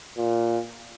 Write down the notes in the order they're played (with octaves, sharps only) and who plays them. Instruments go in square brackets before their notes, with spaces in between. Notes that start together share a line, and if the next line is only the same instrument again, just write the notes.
[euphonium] A#2